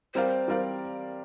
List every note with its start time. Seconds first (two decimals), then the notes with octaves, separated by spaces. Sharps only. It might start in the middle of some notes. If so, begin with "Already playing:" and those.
0.15 G3 C4 A#4 C5 D5 F5
0.48 G3 C4 A#4 D5 F5